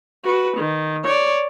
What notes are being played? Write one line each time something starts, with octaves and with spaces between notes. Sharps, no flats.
F#4 B4
D#3
C#5 D5